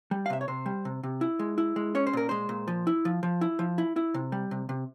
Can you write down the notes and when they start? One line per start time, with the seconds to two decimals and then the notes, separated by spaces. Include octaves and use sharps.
0.11 G3
0.26 F5
0.30 C3 E5
0.41 C#5
0.48 C3 C5
0.66 G3
0.85 C3
1.03 C3
1.21 E4
1.39 G#3
1.58 E4
1.76 G#3
1.95 C#4 C#5
2.07 C5
2.13 A#2 A#4
2.29 G#3 C5
2.49 A#2
2.68 F3
2.87 E4
3.05 F3
3.23 F3
3.41 E4
3.59 F3
3.78 E4
3.96 E4
4.14 C3
4.32 G3
4.51 C3
4.69 C3